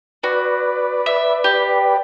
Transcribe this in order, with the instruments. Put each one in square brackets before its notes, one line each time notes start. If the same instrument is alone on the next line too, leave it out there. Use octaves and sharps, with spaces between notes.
[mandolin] F#4 [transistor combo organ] B4 D5
[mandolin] E5
G4